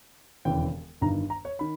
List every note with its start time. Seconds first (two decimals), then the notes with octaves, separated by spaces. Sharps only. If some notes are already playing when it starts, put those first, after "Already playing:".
0.45 E1 D#2 C#3 E3 G5
1.01 G1 G2 D#3 A#5
1.30 A#5
1.45 C#5
1.59 D#3 B5